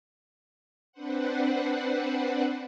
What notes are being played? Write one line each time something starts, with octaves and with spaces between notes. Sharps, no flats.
C4 D4 B4 C5 F#5